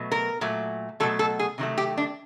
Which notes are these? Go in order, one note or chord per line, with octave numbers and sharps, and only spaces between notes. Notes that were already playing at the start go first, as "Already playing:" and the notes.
Already playing: B2 F#3 A3
A#4
A#2 F#3 A3
B2 F#3 A3 A4
A4
G#4
C3 D#3 F#3 A3
G4
D4